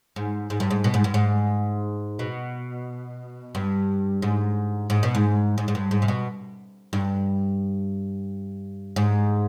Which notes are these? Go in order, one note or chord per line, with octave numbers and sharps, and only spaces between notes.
G#2
G#2
G2
G#2
B2
G#2
G2
G#2
B2
G2
G#2
G#2
B2
G#2
G#2
G#2
G2
G#2
C3
B2
G2
G#2